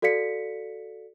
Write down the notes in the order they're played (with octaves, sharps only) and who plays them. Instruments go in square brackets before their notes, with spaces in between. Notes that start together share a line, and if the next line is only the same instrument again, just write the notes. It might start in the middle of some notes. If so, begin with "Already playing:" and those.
[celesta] F#4 A4 D5 F5 B6 C#7